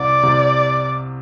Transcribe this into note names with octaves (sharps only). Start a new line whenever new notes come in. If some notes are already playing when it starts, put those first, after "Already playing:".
Already playing: C2 C3 D5
C2 C3